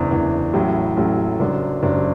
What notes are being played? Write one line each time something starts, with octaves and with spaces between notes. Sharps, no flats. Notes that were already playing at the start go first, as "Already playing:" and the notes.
Already playing: F#1 E2 E3 D4
F#1 E2 E3 D4
A1 A2 F#3
A1 A2 F#3
F#1 F#2 F#3 D4
F#1 F#2 F#3 D4